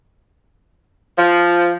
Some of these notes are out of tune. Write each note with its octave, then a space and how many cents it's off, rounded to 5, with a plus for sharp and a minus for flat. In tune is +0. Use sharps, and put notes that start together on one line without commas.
F3 -5